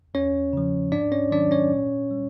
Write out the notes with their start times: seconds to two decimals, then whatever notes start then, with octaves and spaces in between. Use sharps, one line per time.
0.14 E2 C#4 C#5
0.53 C#3 F3
0.92 G#2 D4 D5
1.12 C#4 C#5
1.31 D#3 F#3 D4 D5
1.51 C#4 C#5
1.72 A#2
2.11 G3